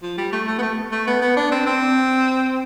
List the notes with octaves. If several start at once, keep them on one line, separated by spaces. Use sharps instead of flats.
F3
G3
A3
A3
B3
A3
A3
B3
B3
D4
C4
C4